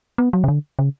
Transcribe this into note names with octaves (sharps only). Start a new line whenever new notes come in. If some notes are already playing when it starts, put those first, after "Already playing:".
B3
F#3
C#3
D3
C#3